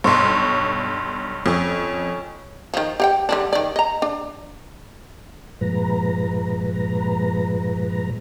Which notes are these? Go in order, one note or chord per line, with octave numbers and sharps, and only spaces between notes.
B1 G2 C#5 A5 C6
F2 C#4 D#6
D#3 F3
G4 F5 G5
D3 G3 D4
D#3 D5
D#5 A#5
D4
G2 A#2 F3 G#3 B4 A#5